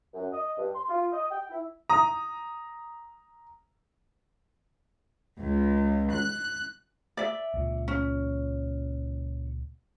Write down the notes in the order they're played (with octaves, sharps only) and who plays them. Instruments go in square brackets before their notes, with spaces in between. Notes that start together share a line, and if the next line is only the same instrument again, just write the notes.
[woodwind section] F#2
D#5
G2
C6
F4
D#5
G5
E4
[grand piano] A#5 D#6
[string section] C#2
F#6
[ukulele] D5 E5
[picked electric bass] C#2 A#2
[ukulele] C#4